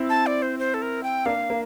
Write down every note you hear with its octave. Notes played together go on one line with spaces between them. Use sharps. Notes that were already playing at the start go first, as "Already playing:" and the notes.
Already playing: C4 E4
A5
D5
C5
C5
A4
A#4
G5
A#3 D4 F5
A#3